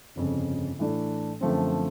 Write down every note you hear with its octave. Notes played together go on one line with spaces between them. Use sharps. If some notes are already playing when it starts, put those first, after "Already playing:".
G1 F2 C#3
A2 E3 A3 D4
F#2 D3 F3 A3 C4